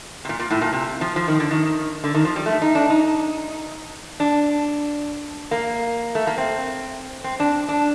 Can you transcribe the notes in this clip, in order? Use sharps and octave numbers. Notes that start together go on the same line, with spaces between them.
C3
A#2
A#2
A2
A#2
C3
F3
F3
D#3
D3
D#3
D3
D#3
F3
G3
A3
D#4
D4
D#4
D4
A#3
A3
A#3
C4
C4
D4
D4